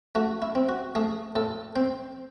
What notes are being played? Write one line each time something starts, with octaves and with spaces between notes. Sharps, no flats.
A3 F#4
E4
C4
F#4
A3 G#4
A2 A4
C4 C5